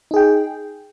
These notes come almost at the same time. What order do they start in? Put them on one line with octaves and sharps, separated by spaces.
D#4 G#4 G5